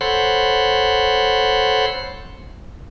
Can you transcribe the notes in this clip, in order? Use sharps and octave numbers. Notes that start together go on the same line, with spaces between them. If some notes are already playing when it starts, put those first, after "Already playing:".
A4 C5 C#5 F#5 B5 C6